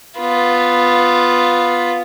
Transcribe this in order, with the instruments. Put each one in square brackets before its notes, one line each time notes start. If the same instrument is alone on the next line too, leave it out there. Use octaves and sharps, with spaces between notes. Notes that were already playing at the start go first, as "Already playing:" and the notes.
[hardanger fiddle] B3 F4